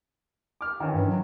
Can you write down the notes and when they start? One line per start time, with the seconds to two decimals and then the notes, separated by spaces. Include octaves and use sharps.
0.61 D6 F6
0.80 D#3 E3 C#4
0.95 G2
1.08 F#3